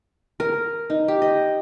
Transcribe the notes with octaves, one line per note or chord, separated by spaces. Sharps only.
A#4
D#4
G4
D#5